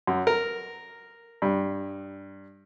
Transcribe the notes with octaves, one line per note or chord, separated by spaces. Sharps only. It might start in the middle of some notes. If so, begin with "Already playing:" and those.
F#2
A#4
G2